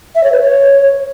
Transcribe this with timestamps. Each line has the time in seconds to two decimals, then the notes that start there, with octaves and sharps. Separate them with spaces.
0.15 E5
0.24 C#5
0.32 B4
0.41 C#5